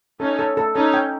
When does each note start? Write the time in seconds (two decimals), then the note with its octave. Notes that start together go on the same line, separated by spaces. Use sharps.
0.20 C#4 D#4 A4
0.39 A4
0.57 A4
0.75 C#4 D#4 A4
0.94 G5